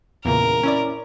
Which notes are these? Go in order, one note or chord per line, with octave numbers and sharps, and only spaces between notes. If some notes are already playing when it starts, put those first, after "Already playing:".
E2 A#2 C#3 A#4
C#4 E4 D5